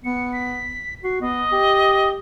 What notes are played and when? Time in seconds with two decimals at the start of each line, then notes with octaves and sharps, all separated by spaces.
0.04 B3 C#7
0.33 B6
1.04 F#4 C7
1.21 B3 D#5
1.52 G4